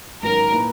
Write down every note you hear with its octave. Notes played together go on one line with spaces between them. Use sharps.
G#1 G#2 F#3 C#4 A#4
A#2 A#3 E4 B4